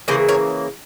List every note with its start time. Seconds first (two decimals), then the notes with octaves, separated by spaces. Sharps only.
0.08 C#3 E3 A#3 G#4 C5
0.28 A#4 C#5